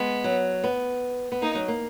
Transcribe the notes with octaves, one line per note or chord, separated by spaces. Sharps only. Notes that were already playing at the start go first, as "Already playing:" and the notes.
Already playing: G#3 B3
F#3
B3
B3
A#3 D#4
F#3
A#3